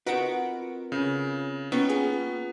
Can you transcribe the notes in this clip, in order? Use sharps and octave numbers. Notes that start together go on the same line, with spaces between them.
C4 D#4 F4 F#4 A#4 B4 F#5 D7
C#3
A#3 B3 C#4 D#4 F4 G5
G#4